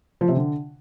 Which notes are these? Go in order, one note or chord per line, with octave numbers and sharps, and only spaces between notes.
F3
C3
D3